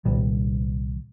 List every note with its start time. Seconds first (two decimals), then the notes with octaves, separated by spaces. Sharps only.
0.05 C2 A#2 D#3 G3